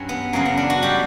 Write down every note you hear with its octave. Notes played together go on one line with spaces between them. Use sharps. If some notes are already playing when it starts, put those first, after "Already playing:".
Already playing: G2 F#3 C#4
B3
F#2 C#3 F#3 A#3
B3
D4
F#4
B2 G3 G4